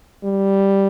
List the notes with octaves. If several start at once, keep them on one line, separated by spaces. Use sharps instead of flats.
G3